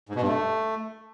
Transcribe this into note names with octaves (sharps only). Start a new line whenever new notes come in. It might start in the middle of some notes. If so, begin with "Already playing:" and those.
G#2
B2
G2
A3